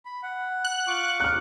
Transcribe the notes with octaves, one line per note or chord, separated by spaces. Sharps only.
B5
F#5
F#6
F4 C#6 D6
F6 F#6